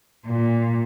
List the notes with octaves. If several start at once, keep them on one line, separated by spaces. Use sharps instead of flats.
A#2